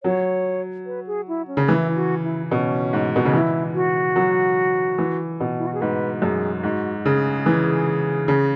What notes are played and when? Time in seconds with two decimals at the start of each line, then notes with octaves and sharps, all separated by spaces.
0.03 F#3 C#5
0.86 B4
1.07 G#4
1.28 E4
1.48 C#4
1.57 C#3
1.69 E3 E4
1.96 F#4
2.24 E4
2.51 B2 C#4
2.93 G#2
3.16 B2
3.25 C#3
3.33 E3 E4
3.75 F#4
4.16 F#3
4.98 E3
5.40 B2
5.59 E4
5.67 F#4
5.74 G#4
5.81 G#2 B4
6.22 F#2 G#4
6.63 G#2 F#4
7.05 C#3 G#4
7.46 E3
8.28 C#3